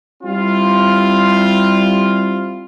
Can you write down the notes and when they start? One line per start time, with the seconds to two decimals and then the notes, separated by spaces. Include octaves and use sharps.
0.23 G3 C4 E4 F4